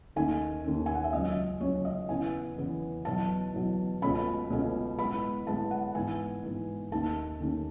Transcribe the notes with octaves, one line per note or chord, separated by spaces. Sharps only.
D#2 D#3 A3 C#4 G#5
D#2 D#3 A3 C#4
G#5
F#5
E5
C#2 C#3 F#3 C#4 D#5
C#2 C#3 F#3 C#4 C#5
D#5
E2 C#3 E3 B3 G#5
E2 C#3 E3 B3
E2 B2 F#3 A5
E2 B2 F#3
C#2 B2 A3 C#4 B5
C#2 B2 A3 C#4
A2 G#3 B3 B5
A2 G#3 B3 A5
F#5
G#2 E3 B3 G#5
G#2 E3 B3
D#2 D#3 A3 C#4 A5
D#2 D#3 A3 C#4